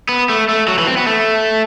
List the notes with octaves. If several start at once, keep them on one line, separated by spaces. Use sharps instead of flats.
B3
A3
A3
F#3
E3
C4
B3
A3